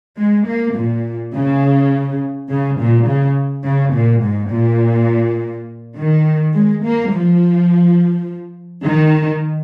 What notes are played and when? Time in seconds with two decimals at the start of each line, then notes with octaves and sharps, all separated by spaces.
0.18 G#3
0.47 A#3
0.76 A#2
1.34 C#3
2.49 C#3
2.78 A#2
3.07 C#3
3.65 C#3
3.94 A#2
4.23 G#2
4.52 A#2
5.96 D#3
6.54 G#3
6.84 A#3
7.12 F3
8.86 D#3